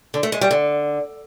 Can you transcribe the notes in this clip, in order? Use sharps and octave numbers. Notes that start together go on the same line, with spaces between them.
D3
A3
G#3
G3
D3